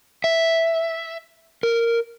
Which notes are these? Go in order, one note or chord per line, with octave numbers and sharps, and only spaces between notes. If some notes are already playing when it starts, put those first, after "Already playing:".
E5
A#4